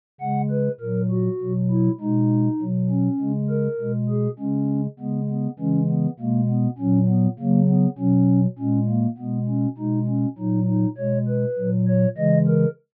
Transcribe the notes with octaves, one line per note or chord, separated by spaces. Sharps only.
C#3 G#3 F#5
B4
A#2 F#3 A#4
F#4
B2 F#3
E4
B2 G#3 D#4
B2 F#3
C#4
C#3 G#3
A#4
B2 G#3
G#4
C#3 G#3 C#4
C#3 G#3 B3
B3
C#3 E3 G#3 C#4
B3
B2 G#3 A#3
B3
A#2 F#3 C#4
B3
C#3 F#3 A#3
B3
B2 F#3 C#4
A#2 G#3 C#4
A#3
B2 G#3 B3
C#4
B2 G#3 D#4
C#4
A#2 F#3 D#4
D#4
B2 G#3 C#5
B4
A#2 F#3
C#5
C#3 E3 G#3 D#5
A#4